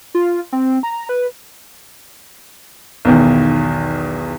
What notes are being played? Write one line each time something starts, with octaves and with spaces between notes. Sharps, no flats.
F4
C4
A#5
B4
B1 E2 D#3